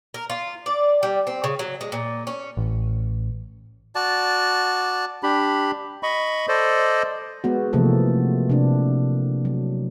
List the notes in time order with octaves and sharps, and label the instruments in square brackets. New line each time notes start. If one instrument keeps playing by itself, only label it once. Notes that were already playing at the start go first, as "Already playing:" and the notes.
[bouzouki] A#4
F4
D5
G3
C4
C#3
F#3
G#3
A#2
C#4
[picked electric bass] A1
[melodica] F#4 D5 A5
[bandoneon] D4 G4 B5
D#5 B5 C#6
A4 C5 D5 D#5
[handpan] G#3 B3 F#4
C3 E3 F3 A3 A#3 A4
C3 D4
F#3